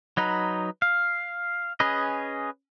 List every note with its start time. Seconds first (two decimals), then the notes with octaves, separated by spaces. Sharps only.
0.17 F#3 D#4 B4
0.82 F5
1.80 C#4 G#4 B4 D#5